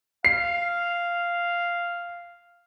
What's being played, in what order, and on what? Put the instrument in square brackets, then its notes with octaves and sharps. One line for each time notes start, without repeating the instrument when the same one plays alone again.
[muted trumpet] F5 [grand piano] C7